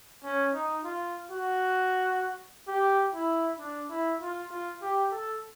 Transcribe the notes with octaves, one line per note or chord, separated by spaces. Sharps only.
C#4
D#4
F4
F#4
G4
E4
D4
E4
F4
F4
G4
A4